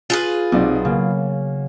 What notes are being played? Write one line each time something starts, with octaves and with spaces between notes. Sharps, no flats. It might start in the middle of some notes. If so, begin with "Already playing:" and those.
F4 G#4 B4
B1 C3 D#4 D5
C#3 A#3